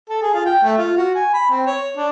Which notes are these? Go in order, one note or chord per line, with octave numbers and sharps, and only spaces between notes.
A4
G#4
F4
G5
A3
F4
F#4
G#5
B5
C4
C#5
D4